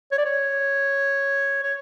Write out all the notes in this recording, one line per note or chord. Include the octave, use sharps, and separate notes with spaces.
C#5
D5
C#5
C#5